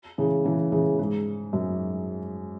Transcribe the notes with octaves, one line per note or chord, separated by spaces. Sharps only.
C#3 E3
C#3 E3
C#3 E3
G#2
F#2